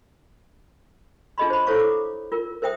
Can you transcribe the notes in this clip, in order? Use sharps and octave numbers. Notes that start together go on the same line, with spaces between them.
D4 F4 G#4 D#5 B5 C6
C5 B5
E4 A4 C5 C#5 F5 C#6
D6
F4 A#4
A#4 C5 E5 G5 D#6